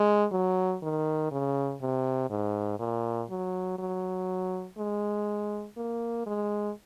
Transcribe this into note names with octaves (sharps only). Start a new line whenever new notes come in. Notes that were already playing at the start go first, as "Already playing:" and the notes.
Already playing: G#3
F#3
D#3
C#3
C3
G#2
A#2
F#3
F#3
G#3
A#3
G#3